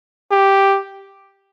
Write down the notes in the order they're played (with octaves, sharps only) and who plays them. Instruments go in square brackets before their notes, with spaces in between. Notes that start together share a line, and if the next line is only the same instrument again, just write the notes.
[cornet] G4